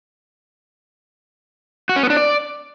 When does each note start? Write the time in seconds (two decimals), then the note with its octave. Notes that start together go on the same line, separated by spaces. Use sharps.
1.89 F#4
1.96 C#4
2.03 B3
2.10 D4
2.17 D5